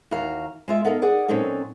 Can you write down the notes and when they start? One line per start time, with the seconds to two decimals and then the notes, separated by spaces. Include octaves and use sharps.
0.11 D#2 E3 F#4 F5 A#5
0.68 G#3 F4 E5
0.84 B3 D#4 A4 A#4 D#5 F5
1.02 G#4 D5 F#5
1.28 A#2 F#3 C4 C#4 D#4 A4